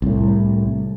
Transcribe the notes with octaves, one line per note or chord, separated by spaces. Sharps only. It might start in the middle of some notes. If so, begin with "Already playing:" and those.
C2 A2